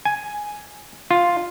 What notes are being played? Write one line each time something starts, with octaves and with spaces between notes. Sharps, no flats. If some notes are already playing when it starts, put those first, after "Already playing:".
G#5
F4